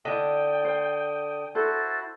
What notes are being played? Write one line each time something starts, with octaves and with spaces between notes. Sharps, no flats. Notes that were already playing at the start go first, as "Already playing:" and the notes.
D3 E4 D#5 G5 D#6
C5
E4 F#4 A4 C5 A6